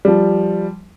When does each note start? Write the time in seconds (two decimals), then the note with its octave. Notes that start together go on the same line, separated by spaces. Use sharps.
0.05 F3 G3